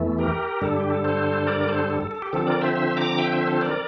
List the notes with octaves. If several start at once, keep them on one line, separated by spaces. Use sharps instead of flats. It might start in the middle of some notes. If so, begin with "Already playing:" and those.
Already playing: E2 E3 A3
G4 A#4
G2 D3 G3 A4
G4
A4
A4 C5
A#4 D5
A4 C5
A4
A4
A4
G4
D3 F3 C4 A4
A#4 D5
C5 E5
C5 E5
A#5 D6
E5 G5
C5 E5
A4 C5
A#4 D5